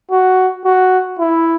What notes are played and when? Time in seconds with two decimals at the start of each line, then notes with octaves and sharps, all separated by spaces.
0.11 F#4
0.64 F#4
1.19 E4